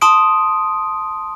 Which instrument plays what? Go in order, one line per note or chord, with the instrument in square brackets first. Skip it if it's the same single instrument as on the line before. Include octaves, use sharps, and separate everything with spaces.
[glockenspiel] A5 C6 D#6 D7